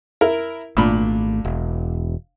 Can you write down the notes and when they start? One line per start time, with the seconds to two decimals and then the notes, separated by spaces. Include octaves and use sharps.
0.21 E4 A#4
0.77 G#1 A#2 A3 D4 B5
1.45 E1